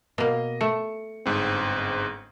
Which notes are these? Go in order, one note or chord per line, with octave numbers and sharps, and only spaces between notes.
B2 A#3 D#5
A3 C#7
G1 G#2 C4